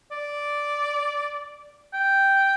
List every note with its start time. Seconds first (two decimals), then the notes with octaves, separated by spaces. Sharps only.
0.11 D5
1.93 G5